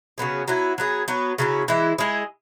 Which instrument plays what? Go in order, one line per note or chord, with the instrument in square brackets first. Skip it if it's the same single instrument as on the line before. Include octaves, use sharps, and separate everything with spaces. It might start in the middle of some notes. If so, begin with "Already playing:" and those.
[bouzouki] C#3 F#3 B3 G#4
F#3 B3 E4
F#3 B3 G#4
F#3 B3 F#4
C#3 F#3 C#4 E4
E3 G#3 E4
G#3 E4 G#4